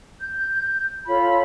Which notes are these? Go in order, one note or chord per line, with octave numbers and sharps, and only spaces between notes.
G6
F4 A4 C#5 B5